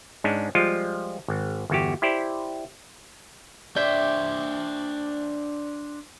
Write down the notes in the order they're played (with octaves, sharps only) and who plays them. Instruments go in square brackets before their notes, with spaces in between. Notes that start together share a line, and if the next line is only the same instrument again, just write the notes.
[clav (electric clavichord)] G#2 G#3 C#4 D4
F3 G3 G#3 F4
G#1
G1 E2 F#4 G4
E4 G4 C5 D5
[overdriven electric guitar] D4 C5 [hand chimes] D5 G6 [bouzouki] E5 G5